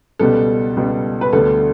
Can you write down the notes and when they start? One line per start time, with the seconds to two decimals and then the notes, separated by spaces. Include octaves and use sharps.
0.19 C#2 B2 G3 B3 A4
0.77 C#2 B2 G3 B3
1.21 B4
1.33 D2 D3 G3 B3 A4